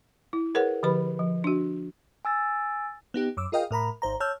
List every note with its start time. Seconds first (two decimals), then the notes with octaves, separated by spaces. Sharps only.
0.33 E4
0.55 G#4 A#4 B4 C#5 F#5
0.83 D3 F3 G4 B4 B5
1.19 F3
1.44 D4 F#4
2.25 G#5 E6 A6
3.14 B3 D#4 G4
3.37 F#2 D6 E6
3.52 F4 G#4 A#4 D#5 F5 G5
3.71 A2 A#4 A#5 B5
4.02 G#1 C5 A#5
4.20 C#5 A5 E6 F6 G6